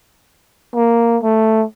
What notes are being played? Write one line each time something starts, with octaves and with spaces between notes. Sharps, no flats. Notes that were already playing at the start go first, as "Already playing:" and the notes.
A#3
A3